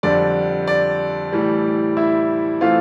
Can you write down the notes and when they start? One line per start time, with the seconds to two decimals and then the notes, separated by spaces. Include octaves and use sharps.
0.03 F2 D3 G3 D5
0.67 D5
1.32 A2 E3 G3
1.97 E4 E5
2.61 E3 A3 C4 F4 F5